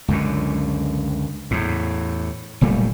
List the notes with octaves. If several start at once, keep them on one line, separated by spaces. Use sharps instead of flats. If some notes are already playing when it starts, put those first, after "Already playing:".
C#2 F#2 D3
E2 A2
F#1 A#2 G3 A3